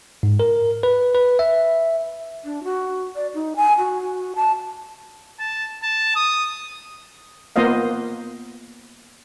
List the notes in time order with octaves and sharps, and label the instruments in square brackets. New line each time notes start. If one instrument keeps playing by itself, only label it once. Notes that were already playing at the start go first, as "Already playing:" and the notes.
[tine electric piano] G#2
A#4
B4
B4
E5
[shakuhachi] D4
F#4
D5
D#4
G#5
F#4
A5
[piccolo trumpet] A5
A5
D#6
[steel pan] A#3 B3 F4 C5 D#5 F5